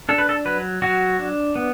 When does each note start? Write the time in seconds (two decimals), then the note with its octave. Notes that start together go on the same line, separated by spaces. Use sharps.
0.09 D4 A4
0.18 B4
0.29 A4
0.45 F#3 B4
0.82 F#3 F#4
1.19 D4
1.55 B3